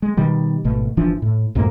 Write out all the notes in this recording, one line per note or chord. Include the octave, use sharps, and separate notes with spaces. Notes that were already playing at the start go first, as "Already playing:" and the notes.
G#3
B2 D#3 G3
G#1 B2 A3
G1 E3 F3 D4
A2
B1 F2 G#2 A#3